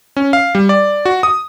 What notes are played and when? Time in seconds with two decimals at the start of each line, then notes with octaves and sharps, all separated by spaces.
0.17 C#4
0.33 F5
0.55 G3
0.69 D5
1.05 F#4
1.23 D#6